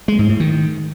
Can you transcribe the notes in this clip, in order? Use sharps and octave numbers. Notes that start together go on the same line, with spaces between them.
G#3
G#2
A2
D#3